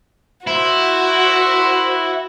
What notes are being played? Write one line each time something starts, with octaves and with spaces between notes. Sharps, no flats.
E4 F#4 C5 B5